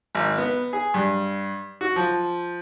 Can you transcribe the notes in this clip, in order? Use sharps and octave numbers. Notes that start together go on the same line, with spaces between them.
G#1
B3
G#4
G2
F#4
F3